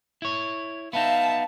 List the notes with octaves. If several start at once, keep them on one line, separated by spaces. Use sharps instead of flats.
E4 C#5
B3 D#4 E5 F5 A5